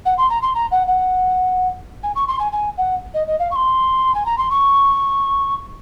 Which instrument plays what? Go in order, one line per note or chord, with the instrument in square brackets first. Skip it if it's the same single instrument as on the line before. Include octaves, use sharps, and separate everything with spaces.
[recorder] F#5
C6
A#5
C6
A#5
F#5
F#5
G#5
C#6
C6
G#5
G#5
F#5
D#5
D#5
F5
C#6
C6
G#5
A#5
C6
C#6